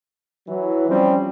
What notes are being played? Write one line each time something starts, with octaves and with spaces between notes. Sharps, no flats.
E3 F#3
F3 G3 C4 C#4